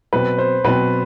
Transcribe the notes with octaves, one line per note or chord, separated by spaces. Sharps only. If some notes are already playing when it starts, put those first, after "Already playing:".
B2 F#3 C4 B4
C5
B2 F#3 C4 B4